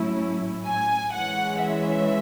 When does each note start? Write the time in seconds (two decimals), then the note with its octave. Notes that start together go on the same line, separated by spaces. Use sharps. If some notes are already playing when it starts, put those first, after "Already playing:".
Already playing: A2 F#3 C#4 E4
0.65 G#5
1.13 E3 G#3 C#4 F#5
1.62 E5